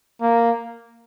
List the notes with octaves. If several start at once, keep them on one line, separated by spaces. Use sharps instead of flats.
A#3